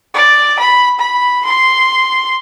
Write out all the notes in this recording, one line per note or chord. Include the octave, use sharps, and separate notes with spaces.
D5
B5
B5
C6